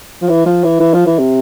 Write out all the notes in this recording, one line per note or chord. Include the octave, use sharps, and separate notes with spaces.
F3
E3
F3
E3
E3
F3
E3
C3